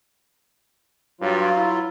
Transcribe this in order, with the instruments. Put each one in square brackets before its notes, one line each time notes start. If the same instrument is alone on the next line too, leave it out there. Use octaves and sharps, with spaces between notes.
[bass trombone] G2 [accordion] F#3 F4
[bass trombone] E4